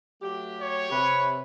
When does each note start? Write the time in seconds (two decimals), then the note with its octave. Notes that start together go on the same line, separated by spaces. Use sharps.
0.22 F#3 A3 G4
0.60 C#5
0.92 C3 B4